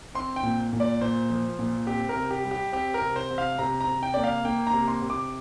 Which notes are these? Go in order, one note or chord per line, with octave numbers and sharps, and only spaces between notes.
C4 C6
G5
A#2
A#2
D5
A#2 C5
F3
A#2
C4 G4
A#4
C3
G4
G3
G4
C4 G4
A#4
C3
C5
C3
F5
C3 A#5
A#5
C3
G5
A#3 D5
F5
A#3 G5
A#5
C3
C6
C3
D6